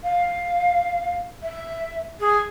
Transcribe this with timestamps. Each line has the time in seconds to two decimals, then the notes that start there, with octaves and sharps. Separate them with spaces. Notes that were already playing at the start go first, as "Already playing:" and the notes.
0.03 F5
1.43 E5
2.20 G#4